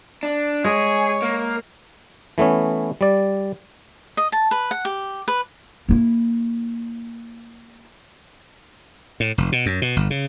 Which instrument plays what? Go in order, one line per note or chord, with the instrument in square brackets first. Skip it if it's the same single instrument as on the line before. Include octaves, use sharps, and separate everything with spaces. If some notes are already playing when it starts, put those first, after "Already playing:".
[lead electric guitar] D4
[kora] G#3 [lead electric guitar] G#4 [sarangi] C#5
[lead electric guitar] A#3
[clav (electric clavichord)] E3 A3 B3 C#4
G3 D5
[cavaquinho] D#5
A5
B4
F#5
G4
B4
[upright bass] A#3 E4
[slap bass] A2
F1
B2
F#2
B2
G1
C#3